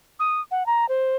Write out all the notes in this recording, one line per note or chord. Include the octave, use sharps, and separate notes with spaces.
D#6
F#5
A#5
C5